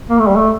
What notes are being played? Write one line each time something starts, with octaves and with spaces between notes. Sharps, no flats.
A#3
A3
G3
A3